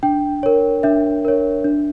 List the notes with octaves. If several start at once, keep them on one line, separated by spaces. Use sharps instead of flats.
D4 G5
A#4 C#5
D4 E5
A#4 C#5
D4